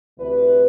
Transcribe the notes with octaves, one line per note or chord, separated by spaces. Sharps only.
D2 C3 E3 B4